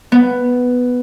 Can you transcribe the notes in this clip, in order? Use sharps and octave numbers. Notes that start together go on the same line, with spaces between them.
B3